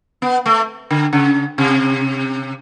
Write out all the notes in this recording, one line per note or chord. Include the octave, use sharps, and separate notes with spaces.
B3
A3
D3
C#3
C3